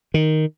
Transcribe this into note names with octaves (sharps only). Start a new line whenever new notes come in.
D#3